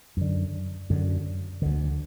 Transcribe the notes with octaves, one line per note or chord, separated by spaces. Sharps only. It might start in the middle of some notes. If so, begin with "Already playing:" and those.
F#2 D3
F#2 D3
D2 D3